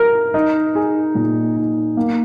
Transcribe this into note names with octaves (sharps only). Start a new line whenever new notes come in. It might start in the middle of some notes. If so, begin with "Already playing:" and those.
Already playing: D#4 A#4
D#4
G#4
A#2
D#4
A#3